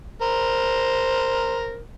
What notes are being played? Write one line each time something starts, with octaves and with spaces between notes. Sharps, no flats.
A#4 C5